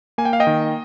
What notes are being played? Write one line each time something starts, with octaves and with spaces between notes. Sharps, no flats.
A#3 G#5
G5
F5
D#5 G5
D#3